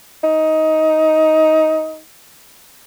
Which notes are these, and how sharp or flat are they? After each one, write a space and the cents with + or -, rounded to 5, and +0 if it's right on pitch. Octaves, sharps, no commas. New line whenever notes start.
D#4 +15